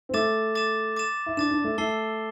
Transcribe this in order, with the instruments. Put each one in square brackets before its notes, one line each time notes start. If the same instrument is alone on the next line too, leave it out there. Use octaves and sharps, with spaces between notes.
[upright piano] C4
[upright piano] A3 [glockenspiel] D6 A6 E7
[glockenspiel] D6 A6 E7
D6 A6 E7
[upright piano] E4
[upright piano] D4 [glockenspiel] D6 A6 E7
[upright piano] D4
A3
[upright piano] A3 [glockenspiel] A5 E6 C7 G7